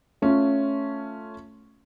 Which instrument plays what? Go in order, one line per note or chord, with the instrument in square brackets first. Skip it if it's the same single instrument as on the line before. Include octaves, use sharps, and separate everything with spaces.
[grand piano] A3 C#4 F4